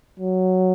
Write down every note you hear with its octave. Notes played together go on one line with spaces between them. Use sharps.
F#3